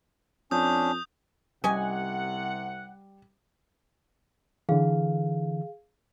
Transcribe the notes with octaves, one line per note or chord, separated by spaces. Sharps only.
F2 C#4 D4 D#6 G6
C2 C3 G3 C#4 D#5 F#5 G#5
D3 E3 G#4 F5